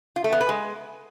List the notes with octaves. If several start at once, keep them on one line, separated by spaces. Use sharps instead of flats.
F4
A3
B3
B4
G#3